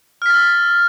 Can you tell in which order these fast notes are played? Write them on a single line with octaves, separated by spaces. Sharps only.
F6 B6 A6 E6